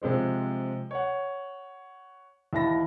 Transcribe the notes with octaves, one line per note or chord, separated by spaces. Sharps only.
C3 F3 G#3 C4
C#5 F#5
D#2 E3 E5 A5 B5 A#6